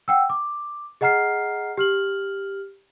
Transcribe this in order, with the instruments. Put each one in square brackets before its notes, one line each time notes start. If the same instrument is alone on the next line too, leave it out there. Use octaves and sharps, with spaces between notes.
[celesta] F#5 G5 E6
D6
G#4 D#5 F#5 A#5 F6 C7
G4 F6 F#7